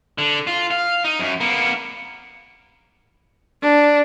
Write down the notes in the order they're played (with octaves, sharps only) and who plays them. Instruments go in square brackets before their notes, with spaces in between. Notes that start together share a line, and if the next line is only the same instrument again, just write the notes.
[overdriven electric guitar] D3
F4
F5
D#4
F#2
A#3 B3
[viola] D4